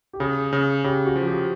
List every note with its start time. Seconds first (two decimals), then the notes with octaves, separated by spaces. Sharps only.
0.13 G4
0.20 C#3 G#4
0.53 C#3
0.84 C#3 G4
1.06 F#4
1.16 F3
1.27 G4